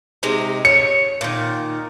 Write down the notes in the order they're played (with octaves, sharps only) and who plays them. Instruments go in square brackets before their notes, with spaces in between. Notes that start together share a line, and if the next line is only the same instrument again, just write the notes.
[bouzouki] C3 G#3 D#4
[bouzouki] C#5 [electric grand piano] C#7
[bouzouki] A#2 D#3